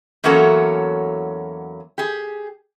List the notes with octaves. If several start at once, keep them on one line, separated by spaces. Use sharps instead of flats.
E2 F#3 A#3 C#4 F#4 A4
G4 G#4